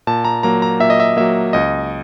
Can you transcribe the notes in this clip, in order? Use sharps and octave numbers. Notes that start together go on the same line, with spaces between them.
A#2 A5
A#5
F#3 A#3 A#5
A#5
A#2 E5
D#5
E5
F#3 A#3 E5
C#2 D#5